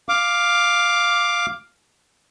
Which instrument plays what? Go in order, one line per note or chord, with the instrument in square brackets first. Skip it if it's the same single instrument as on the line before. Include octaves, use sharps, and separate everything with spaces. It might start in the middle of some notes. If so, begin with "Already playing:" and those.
[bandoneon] F5 D6